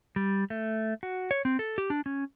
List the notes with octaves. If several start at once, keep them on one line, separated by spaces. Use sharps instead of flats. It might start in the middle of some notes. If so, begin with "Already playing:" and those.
G3
A3
F#4
C#5
C4
A4
G4
D4
C#4